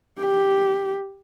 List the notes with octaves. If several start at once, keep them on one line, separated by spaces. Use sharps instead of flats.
G4